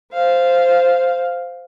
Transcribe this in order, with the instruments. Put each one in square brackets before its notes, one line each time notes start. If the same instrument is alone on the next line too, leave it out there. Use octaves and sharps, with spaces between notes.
[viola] C5 F5